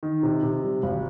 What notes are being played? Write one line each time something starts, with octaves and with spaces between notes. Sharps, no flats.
D#3
C3
C3
G3
G#1